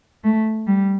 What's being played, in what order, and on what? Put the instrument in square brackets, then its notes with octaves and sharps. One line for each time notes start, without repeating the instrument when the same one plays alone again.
[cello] A3
G3